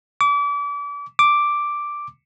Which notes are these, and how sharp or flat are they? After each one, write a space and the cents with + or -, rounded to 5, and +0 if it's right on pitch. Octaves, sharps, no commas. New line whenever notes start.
D6 -35
D6 +0